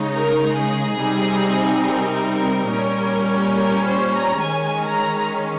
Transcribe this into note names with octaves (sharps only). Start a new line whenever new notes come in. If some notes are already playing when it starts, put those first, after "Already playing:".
Already playing: C#3 G#3 D#4
A#4
G#4
C3 G3 C4 D#4
A#4
A#2 G3 C#4
A#4
C5
A#5
D#3 G#3 C#4 G#5
A#5